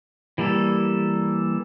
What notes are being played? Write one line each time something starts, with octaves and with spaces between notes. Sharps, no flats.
E3 G3 A#3 A4